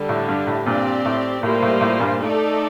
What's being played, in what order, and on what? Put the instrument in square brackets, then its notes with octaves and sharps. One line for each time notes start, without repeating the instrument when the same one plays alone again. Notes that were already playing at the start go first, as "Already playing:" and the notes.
Already playing: [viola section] D3 G3 D4 G4
[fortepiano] A2
G2
A2
[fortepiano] G2 A#2 [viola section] C4 G4 D5
[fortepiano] A2
[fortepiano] A2 [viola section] G3 A#3 F4 C5
[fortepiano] A2
A2
G2 A#2
[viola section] A3 D#4 A4 D5